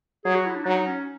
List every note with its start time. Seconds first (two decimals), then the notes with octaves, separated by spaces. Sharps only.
0.25 F#3 G#4
0.35 F#4
0.45 E4
0.55 D4
0.65 F#3 D#4
0.87 C#4